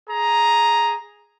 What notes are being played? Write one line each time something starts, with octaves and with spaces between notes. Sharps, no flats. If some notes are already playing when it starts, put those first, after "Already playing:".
G#4 A#5